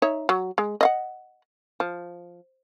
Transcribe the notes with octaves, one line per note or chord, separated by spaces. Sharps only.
D#4 C#5 E5
F#3
G#3
D#5 F5 F#5
F3